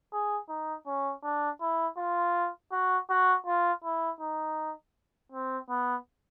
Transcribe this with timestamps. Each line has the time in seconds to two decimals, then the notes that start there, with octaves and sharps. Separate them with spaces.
0.13 G#4
0.49 D#4
0.86 C#4
1.23 D4
1.61 E4
1.97 F4
2.72 F#4
3.10 F#4
3.46 F4
3.84 E4
4.20 D#4
5.32 C4
5.69 B3